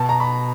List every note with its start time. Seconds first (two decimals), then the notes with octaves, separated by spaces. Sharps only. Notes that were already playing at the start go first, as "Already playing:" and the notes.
Already playing: B2 A5
0.09 A#5
0.20 B5